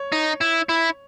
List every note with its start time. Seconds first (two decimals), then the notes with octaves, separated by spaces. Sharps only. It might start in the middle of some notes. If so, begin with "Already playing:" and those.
Already playing: C#5
0.12 D#4
0.41 E4
0.69 E4